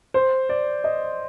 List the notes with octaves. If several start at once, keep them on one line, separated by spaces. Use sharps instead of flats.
C5
D5
D#5